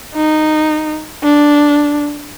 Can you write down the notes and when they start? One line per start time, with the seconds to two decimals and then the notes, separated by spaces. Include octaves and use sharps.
0.14 D#4
1.23 D4